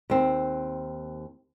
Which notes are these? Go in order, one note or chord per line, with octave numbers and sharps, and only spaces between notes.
D#2 C4